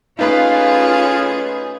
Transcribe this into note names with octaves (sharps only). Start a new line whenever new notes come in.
A3 C#4 D#4 F4 G#4 B4 F5 B5